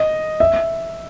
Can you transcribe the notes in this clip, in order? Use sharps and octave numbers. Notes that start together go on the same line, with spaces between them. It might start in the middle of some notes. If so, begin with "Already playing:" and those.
Already playing: D#5
E5